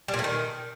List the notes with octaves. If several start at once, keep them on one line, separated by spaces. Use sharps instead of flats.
G3
A#2
A3
D#3